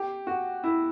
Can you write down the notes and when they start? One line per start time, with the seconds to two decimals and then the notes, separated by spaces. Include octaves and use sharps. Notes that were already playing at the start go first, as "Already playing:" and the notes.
Already playing: G4
0.27 F#4
0.64 E4